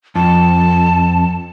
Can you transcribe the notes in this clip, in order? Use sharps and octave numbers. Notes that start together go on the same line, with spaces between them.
F2 A5